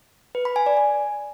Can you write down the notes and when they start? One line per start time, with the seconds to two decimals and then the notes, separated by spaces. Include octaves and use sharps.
0.35 B4
0.45 B5
0.56 G#5
0.66 D5
0.77 G#5